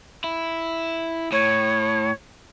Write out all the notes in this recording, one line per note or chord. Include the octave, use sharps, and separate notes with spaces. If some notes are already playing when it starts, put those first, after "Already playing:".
E4
A2 C#5